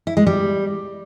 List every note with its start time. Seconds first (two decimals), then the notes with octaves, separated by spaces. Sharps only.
0.07 E4
0.17 G#3
0.27 G3